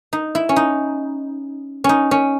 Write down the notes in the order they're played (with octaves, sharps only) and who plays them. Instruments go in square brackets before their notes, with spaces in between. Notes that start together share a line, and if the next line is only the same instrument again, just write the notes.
[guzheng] D#4
E4
C#4
D#4
C#4 D#4
C#4